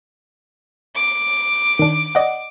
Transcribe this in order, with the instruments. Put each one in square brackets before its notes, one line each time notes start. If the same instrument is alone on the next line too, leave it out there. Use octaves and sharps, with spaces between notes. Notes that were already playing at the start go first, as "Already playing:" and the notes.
[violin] D6
[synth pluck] D#3 D4
D5 D#5 F#5